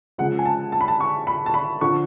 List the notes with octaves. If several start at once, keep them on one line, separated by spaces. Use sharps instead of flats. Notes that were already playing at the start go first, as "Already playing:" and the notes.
C#3 F3 G#3 F#5
G#5
A5
A5
B5
A5
C#6
B5
A5
B5
D3 F3 C#6